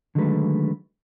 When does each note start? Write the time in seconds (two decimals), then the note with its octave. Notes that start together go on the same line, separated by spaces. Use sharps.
0.15 D3 D#3 F#3 G#3 A3 B4